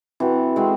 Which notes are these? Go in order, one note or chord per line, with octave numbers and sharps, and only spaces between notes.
E3 C4 F#4 A4
G#3 C4 F#4